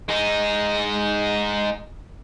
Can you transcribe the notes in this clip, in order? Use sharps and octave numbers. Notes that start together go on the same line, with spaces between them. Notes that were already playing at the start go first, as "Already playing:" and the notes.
G#3 D#4